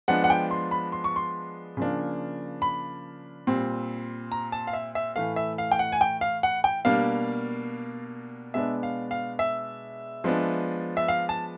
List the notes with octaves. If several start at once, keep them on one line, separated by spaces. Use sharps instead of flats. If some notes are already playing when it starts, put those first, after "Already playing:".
F3 G#3 B3 D4 F#5
F#5
G5
C6
B5
C6
C#6
C6
C#3 F3 A#3 D4
B5
A#2 G3 C4
A#5
A5
F5
E5
E5
A2 E3 A3 F5
E5
F5
G5
F#5
G#5
G5
F5
F#5
G5
B2 G3 A#3 D4 F5
B2 G#3 B3 D4 E5
F5
F5
E5
F3 G#3 B3 D4
E5
F5
A5